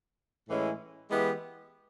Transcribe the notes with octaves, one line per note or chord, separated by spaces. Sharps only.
A2 E3 G#3 C#4 E4
E3 G#3 B3 E4 G4